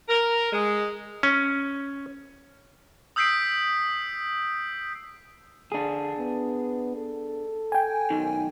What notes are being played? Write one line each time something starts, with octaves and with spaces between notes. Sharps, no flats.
A#4
G#3
C#4
D#6 E6 G6 B6 C7 D7
D3 D4 G#4
B3
A4
G5 G#5
B1 F#2 D#3